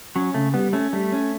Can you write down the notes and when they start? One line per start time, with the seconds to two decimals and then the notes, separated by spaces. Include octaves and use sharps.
0.15 F#3 C#4
0.34 C#3 A3
0.54 G3 B3
0.73 A3 C#4
0.93 G3 A3
1.12 C#4